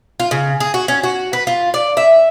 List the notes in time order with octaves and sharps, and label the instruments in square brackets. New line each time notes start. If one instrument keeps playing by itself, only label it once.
[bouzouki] F4
C#3
G#4
F#4
C#4
F#4
B4
F4
D5
E5